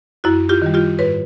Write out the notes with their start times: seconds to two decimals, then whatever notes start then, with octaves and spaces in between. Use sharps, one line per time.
0.24 F#2 E4 F#4
0.49 F4 G4
0.62 D#3 G3
0.74 F4 G4
0.99 G#2 B4 C#5